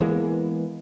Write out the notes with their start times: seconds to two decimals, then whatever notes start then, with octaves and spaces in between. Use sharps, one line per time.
0.01 E3 G#3 A#3 B3